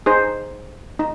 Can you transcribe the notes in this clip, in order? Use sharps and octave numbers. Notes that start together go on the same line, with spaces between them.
D#4 G#4 C5
D#4